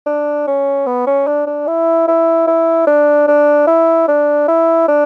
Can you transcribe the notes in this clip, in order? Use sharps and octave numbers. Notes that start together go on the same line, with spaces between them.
D4
C#4
B3
C#4
D4
D4
E4
E4
E4
D4
D4
E4
D4
E4
D4